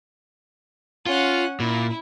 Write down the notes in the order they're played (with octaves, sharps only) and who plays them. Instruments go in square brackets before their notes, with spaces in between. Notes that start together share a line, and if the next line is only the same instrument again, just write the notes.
[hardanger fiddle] C#4 F#5 [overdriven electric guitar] F4
[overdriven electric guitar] A#2 [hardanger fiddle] E4